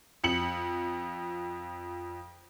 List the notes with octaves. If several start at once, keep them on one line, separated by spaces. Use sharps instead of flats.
F2 C#7 F#7